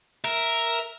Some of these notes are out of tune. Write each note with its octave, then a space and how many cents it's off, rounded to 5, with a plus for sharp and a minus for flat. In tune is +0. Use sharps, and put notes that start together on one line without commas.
A#4 +0 E5 +0